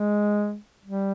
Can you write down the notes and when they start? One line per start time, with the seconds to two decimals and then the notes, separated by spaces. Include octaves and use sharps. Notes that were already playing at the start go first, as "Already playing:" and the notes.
Already playing: G#3
0.85 G3